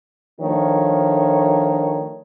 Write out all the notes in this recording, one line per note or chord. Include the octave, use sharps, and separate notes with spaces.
D#3 F3 A3 D4 C#5